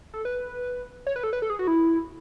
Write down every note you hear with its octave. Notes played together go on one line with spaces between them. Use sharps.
A4
B4
C#5
B4
A4
B4
A4
G#4
F#4
E4